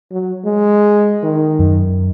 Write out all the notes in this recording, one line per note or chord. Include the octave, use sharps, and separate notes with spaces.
F#3
G#3
D#3
F#2